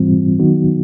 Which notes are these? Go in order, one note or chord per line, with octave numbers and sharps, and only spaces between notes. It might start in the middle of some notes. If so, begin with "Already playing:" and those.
Already playing: G#2 E3 G3 C4 F4
D#3 F#3 B3 D#4 F#4